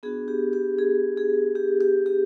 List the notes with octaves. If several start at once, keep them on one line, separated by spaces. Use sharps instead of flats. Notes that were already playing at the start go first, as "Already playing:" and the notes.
B3 D4 F#4 G#4
G4
G4
G#4
G#4
G4
G4
G4